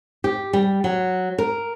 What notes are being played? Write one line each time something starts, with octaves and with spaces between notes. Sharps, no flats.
G4
G3
F#3
A#4